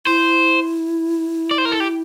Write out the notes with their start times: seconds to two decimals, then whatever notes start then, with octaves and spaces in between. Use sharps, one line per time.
0.07 E4 C5
1.51 D5
1.58 C5
1.65 A#4
1.72 A4
1.80 G4